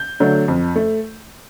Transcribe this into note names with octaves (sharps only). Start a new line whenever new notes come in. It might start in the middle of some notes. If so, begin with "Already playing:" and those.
Already playing: G6
D3 F#3 A3
F2
A3